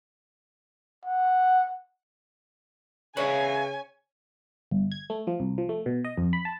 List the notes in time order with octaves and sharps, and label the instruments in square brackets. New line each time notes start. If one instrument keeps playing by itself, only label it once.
[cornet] F#5
[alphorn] C#3 [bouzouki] C#4 [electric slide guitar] B4 E5 F5 [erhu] G#5
[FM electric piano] G1
G#6
A3
F3
C2
F3
A3
B2
D#5
F2
B5
A5